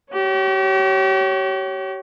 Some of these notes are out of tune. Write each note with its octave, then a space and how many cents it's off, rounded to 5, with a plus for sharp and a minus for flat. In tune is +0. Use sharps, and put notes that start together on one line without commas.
G4 -40 C#5 +0